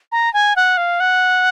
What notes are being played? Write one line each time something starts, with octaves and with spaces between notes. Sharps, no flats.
A#5
G#5
F#5
F5
F#5